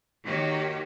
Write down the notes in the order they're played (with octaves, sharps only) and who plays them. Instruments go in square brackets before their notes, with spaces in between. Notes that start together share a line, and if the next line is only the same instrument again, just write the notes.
[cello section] D#3 A#3 F#4 G4 C#5